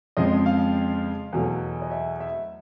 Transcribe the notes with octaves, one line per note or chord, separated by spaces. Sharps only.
F2 C#3 F3 G#3 D#5
F5
E2 B2 F#3 A3
D#5
E5
E5